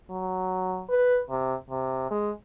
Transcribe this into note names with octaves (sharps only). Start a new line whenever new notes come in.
F#3
B4
C3
C3
G#3